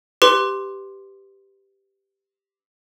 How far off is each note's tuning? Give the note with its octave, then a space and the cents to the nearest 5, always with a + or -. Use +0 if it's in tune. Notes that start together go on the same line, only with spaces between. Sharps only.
G4 +0 B4 +20 C6 +0